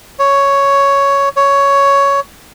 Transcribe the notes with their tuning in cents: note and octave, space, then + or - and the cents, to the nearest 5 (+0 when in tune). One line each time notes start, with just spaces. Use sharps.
C#5 +5
C#5 +10